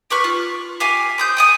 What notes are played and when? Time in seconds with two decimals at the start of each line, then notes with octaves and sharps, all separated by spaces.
0.10 G4 B4 C#6 F6
0.24 F4
0.80 G4 F5 G#5
1.18 C4 D#6 G6
1.37 G5 G#5 D#6